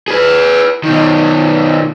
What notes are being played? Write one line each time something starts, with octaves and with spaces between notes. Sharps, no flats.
G#4 B4
B2 D#3